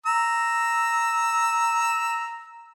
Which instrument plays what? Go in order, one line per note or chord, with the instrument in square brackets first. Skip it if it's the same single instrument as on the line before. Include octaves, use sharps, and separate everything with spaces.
[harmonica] A#5 E6